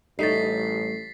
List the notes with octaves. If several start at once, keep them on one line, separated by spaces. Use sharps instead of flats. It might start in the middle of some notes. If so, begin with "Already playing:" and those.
A1 G3 A3 D#4 C#5 A6 B6 C7